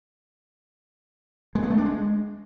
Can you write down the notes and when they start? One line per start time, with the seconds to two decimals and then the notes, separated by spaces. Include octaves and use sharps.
1.55 G#3
1.63 B3
1.70 A3
1.78 D4
1.85 G#3